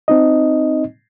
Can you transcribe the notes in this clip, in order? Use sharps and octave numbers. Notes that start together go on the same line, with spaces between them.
C4 D#4 D#5